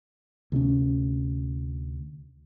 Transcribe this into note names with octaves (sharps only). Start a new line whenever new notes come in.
D2 C3 C4 C#4